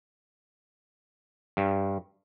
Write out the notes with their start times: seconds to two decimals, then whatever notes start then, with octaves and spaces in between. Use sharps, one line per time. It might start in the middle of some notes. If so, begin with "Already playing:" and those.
1.57 G2